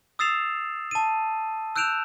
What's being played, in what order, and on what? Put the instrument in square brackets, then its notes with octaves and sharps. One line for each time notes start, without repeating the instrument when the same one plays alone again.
[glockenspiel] D#6 E6 A6 C7 E7 F7
A5 D#7
E6 F#6 G6 D7 E7 F7